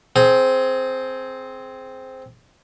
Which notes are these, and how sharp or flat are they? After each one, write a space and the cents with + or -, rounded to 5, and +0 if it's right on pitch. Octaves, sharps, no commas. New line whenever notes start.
C4 +0 G#4 +20